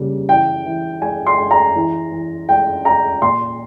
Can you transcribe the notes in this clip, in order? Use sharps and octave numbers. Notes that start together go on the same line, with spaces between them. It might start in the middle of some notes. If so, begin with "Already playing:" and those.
Already playing: C#3 G3 A#3
E3 G5
E3
G#3 G#5
C6
G#3
A#5
E3
E3
G#3 G5
G#3 A#5
A#2 C6